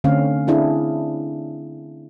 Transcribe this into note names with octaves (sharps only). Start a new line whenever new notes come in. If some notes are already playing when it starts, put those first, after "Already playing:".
D3 A3 C4 C#4 F5
C4 D4 E4 G#4